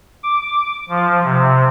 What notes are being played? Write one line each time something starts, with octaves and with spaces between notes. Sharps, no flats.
D6
F3
C3